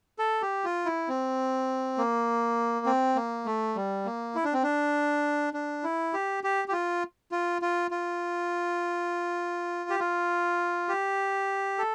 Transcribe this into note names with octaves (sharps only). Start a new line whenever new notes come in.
A4
G4
F4
E4
C4
A#3
C4
A#3
A3
G3
A#3
E4
D4
C4
D4
D4
E4
G4
G4
G4
F4
F4
F4
F4
G4
F4
G4
A4